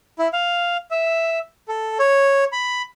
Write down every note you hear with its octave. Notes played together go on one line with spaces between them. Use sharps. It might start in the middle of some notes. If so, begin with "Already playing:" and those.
E4
F5
E5
A4
C#5
B5